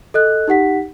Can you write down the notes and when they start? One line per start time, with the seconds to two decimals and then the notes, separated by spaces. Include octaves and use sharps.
0.14 A4 D#5 F#6
0.48 D#4 G4 F#5 B6